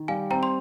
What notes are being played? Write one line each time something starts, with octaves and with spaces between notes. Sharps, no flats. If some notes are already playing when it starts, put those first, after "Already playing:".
Already playing: D#3
G3 F5 G#5
C4 G5 A#5
C6